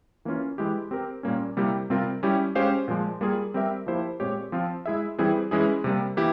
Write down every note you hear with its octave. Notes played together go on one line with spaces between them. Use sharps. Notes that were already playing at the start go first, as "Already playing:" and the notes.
E3 A#3 C#4 F4
E3 G#3 E4 G4
C4 G4 A#4
A#2 G3 A#3 C#4
C3 G3 A#3 E4 G4
C3 G3 C4 F4 A#4
G3 C#4 E4 G4
G#3 C#4 G4 C5 F5
A#2 F3 G#3
G3 A#3 F4 G#4
G3 C4 G4 A#4 E5
F3 A#3 E4 G4 C5
A#2 G#3 C4 G4 C#5
F3 C4 F4
G#3 E4 G#4 E5
E3 G3 C4 E4 G#4
E3 G#3 C#4 E4 G#4
C3 G3 A#3
E3 A#3 E4 G4